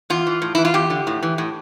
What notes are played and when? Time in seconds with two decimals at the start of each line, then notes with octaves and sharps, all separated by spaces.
0.10 E2 F4
0.27 E3
0.42 A2
0.55 E3 E4
0.65 F4
0.74 E2 G4
0.90 D3
1.07 A2
1.23 E3
1.38 A2